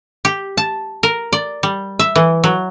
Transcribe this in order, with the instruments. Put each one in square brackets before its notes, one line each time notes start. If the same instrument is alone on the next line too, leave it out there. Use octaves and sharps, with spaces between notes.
[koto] G4
A5
A#4
D5
G3
E5
E3
F#3